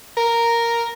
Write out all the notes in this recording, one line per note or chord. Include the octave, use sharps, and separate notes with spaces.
A#4